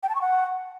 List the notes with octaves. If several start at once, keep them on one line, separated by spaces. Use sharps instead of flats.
G5
A5
C#6
F#5